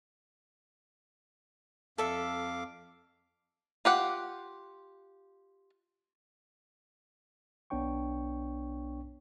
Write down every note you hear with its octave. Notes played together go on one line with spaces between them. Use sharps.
F2 A4 E5 F5 D6
F4 G4 F#5
B1 B3 D4 C#5 G5 C#6